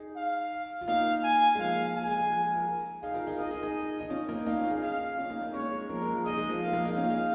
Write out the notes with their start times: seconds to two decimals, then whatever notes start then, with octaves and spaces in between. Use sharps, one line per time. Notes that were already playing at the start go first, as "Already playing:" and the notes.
Already playing: D#4 G#4
0.16 F5
0.81 F4
0.87 A#3 D#4 F5
1.23 G#5
1.55 G#3
1.59 F3 A#3 F5
1.95 F3 G#5
2.07 G#3
2.19 G#3
2.31 F3
2.43 G#3
2.55 F4 A#4
3.03 D#4 G#4 F5
3.14 F4 A#4
3.27 D#4 G#4
3.38 F4 A#4 D#5
3.51 D#4 G#4
3.62 D#4 G#4
4.00 D#4
4.10 C#4 F4
4.29 A#3 D#4
4.46 A#3 D#4 F5
4.58 C#4 F4
4.70 D#4 G#4
4.82 D#4 G#4 F5
5.18 C#4 F4
5.30 A#3 D#4
5.42 A#3 D#4
5.53 G#3 C#4 C#5
5.72 G#3
5.89 F3 A#3 A#4
6.02 G#3
6.13 F3
6.25 D#4 G#4 D#5
6.37 G#3
6.49 F3 A#3
6.61 F5
6.68 G#3
6.73 F3 A#3
6.85 A#3 D#4
6.97 C#4 F4 F5
7.09 D#4 G#4